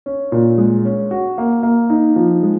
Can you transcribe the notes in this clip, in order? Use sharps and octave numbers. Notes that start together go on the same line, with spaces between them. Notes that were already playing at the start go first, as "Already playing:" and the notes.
C#4
A#2
G#3
C#4
F#4
A#3
A#3
D#4
F3
G#3